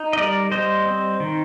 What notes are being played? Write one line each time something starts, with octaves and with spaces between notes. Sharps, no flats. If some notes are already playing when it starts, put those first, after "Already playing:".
Already playing: D#4
D#5
G3 A#4 D5
G3 C5 D#5
C4
D#3